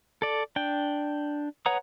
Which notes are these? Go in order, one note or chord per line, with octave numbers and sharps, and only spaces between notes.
A4 D5
D4 G5
B4 C#5 F#5 A#5 D#6